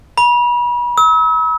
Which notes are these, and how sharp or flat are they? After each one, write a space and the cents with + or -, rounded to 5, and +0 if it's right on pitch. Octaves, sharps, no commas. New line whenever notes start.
B5 -35
E6 -40